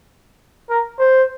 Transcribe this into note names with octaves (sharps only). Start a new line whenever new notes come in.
A#4
C5